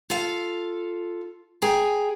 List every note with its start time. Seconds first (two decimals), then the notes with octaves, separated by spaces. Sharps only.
0.10 F4 A4 F5
1.62 G#4 G5 G#5 A#5